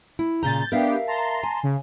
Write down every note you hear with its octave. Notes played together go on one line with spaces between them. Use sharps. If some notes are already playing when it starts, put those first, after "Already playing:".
E4
A#2 C#3 A#5 G6 A6
B3 D4 G4 A#4 E5 F5
A5 A#5 C6
G#5
C#3